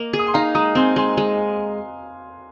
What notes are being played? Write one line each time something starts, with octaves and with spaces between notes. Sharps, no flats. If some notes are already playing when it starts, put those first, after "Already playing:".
Already playing: A#3 D#5
G#4
D#6
C6
D#4 F5 A#5
G#3 A#5 D#6
C4 G#5 C6
G#3 G#5 C6
G#3